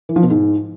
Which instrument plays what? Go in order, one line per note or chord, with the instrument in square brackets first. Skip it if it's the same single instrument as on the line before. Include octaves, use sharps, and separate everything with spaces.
[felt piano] E3
F3
B2
G#2